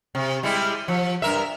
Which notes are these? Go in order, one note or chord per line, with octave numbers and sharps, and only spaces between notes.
C3
G3 G#3 E4
F3
G2 A#4 E5